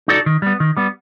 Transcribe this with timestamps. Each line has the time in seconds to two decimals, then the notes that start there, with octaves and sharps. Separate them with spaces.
0.08 D#4 F#4 A4 D5
0.26 D#3
0.42 G3 B3
0.60 D#3
0.77 G3 B3